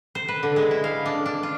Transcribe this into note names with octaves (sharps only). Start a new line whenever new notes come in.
C5
B4
D3
G#3
E4
F5
D4
D4
F4